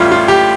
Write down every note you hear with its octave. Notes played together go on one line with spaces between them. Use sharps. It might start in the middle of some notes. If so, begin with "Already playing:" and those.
Already playing: A1 A2 G3 E4 F4
F4
G4